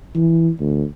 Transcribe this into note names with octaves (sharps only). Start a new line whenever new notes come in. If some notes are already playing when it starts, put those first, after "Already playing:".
E3
D2